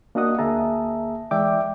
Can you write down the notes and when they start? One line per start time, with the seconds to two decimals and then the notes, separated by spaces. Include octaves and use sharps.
0.15 A#3 D4 F#4 D#5 F#5 D#6
0.39 D2 A#3 G#4 E5 A5 A#5
1.31 E3 G#3 D5 E5 G5 D6